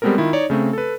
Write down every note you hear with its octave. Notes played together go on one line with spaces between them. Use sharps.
G3 G#3 B3 C4 A4 A#4
D#3 E4 F4
D#4 C#5 D5
C#3 A3 C4
A4 B4